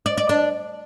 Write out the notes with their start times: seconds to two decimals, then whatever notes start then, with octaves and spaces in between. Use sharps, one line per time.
0.06 D5
0.18 D5
0.29 D4